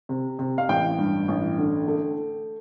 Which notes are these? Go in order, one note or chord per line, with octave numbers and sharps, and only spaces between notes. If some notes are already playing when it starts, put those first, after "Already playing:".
C3
C3
F5
A1 G5
G2
A1
D3
A3